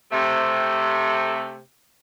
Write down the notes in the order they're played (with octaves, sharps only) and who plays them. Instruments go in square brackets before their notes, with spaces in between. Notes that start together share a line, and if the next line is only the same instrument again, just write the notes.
[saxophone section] C3 A3